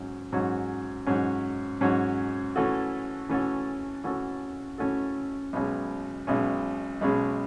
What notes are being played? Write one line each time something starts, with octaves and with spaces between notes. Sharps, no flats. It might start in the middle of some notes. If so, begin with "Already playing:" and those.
Already playing: G#2 F#3 C#4
G#2 F#3 C#4
G#2 F#3 C#4
G#2 F#3 C#4
E3 A3 C#4 F#4 A4
E3 A3 C#4 F#4 A4
E3 A3 C#4 F#4 A4
E3 A3 C#4 F#4 A4
B1 B2 G#3 C#4
B1 B2 G#3 C#4
B1 B2 G#3 C#4